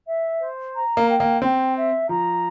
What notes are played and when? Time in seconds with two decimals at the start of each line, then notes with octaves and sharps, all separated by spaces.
0.08 E5
0.41 C5
0.75 A#5
0.97 A#3
1.09 G5
1.20 A#3
1.42 C4 G5
1.76 E5
2.09 F3 A#5